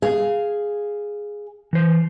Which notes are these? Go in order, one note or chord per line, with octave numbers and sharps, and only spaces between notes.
G#4 F5
E3 C5